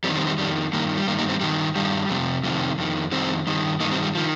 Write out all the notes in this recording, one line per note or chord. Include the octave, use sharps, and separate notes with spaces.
F2 G3 C4
D#3
G3 C4
G3 C4
F2 D#3 G3
G2 D#3 A#3
G3
G2 D#3 A#3
A#3 D#4
G3 C4
G2 D#3 G3
G2 D#3 G3
F2 C3
F2 C3 D#3
F2 D#3
F2 D#3 G3 C4
G2 D#3
G2 D#3 A#3 D#4
G3 C4
G3
D#3 F3